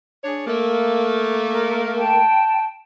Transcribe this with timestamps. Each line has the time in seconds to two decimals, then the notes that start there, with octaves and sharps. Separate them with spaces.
0.24 D4 G#4 C#5
0.47 A3 A#3
1.44 A#4
1.97 G5 A5